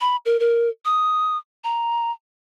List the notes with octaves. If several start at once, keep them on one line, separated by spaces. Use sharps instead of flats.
B5
A#4
A#4
D#6
A#5